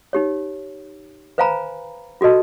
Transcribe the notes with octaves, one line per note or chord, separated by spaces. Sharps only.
D#4 G4 C#5
B4 C5 F5 G#5 A#5 B5
F4 F#4 A4 D#5 A5